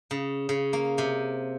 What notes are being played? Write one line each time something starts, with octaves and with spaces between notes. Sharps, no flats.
C#3
C#3
A#3
C3